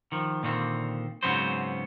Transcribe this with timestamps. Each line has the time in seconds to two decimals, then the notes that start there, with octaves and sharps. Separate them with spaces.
0.12 D#3 F3
0.43 A#2 D3 D#3 C4
1.23 G#2 C#3 F#3 B3 C4 C5